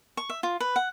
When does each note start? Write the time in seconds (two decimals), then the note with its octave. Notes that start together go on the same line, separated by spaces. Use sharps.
0.17 C#6
0.30 E5
0.43 F4
0.60 B4
0.76 F#5